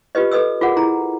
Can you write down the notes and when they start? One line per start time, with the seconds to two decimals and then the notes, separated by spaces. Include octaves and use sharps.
0.15 F4 G4 B4 D#5
0.31 A4 B4 D#5 D#6 E6
0.61 F4 G#4 A#4 F#5
0.76 E4 G#4 A#5